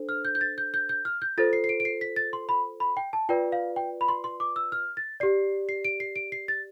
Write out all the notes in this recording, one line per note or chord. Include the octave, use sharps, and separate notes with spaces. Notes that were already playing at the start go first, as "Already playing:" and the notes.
Already playing: D4 A4 C5
F6
G6
G6
A6
G6
G6
G6
F6
G6
F4 A4 C5 A6
C7
C7
D7
D7
C7
B6
A6
C6
B5
B5
G5
A5
F4 B4 D5 G5
F5
G5
B5
C6
C6
D6
E6
F6
A6
G4 D5 C7
C7
D7
C7
D7
C7
A6